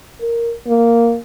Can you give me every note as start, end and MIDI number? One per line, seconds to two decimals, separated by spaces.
0.21 0.53 70
0.67 1.17 58